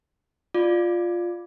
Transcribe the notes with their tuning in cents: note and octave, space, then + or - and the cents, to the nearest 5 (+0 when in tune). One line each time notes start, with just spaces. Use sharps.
F4 +5 D5 +15 D6 +0